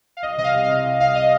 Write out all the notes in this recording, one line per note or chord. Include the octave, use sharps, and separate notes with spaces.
F5
C2 D#5
C3 D#5
F5
C2
F5
C3
C2
C2 F5
D#5